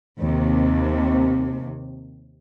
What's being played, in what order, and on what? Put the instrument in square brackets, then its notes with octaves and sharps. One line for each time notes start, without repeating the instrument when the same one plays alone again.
[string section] D#2 C3